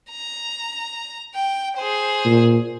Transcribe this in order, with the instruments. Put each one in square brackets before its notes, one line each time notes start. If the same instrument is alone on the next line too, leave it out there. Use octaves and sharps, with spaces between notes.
[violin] A#5
G5
G#4 C5
[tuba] A#2